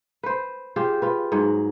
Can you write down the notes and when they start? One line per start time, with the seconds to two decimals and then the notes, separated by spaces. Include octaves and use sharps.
0.23 B4 C5
0.76 F4 G4 G#4 C5
1.02 F4 B4
1.32 G#2 F#3 D#5 F#5